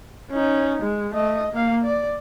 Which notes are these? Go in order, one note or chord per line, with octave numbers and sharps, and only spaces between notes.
C#4 D#4
G#3
A3 D#5
A#3 F5
D5